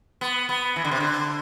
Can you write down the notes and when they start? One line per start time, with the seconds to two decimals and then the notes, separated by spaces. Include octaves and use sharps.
0.21 B3
0.49 B3
0.76 E3
0.84 D3
0.91 C3
1.00 D3